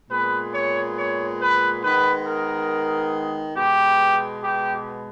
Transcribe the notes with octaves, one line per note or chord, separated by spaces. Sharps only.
A#2 G#3 B3 B4
C#5
C#5
B4
D#3 G#3 B3 B4
A#4
B2 G#3 B3 G4
G4